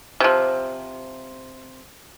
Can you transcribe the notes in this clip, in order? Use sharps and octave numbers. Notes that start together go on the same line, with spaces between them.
C3 F3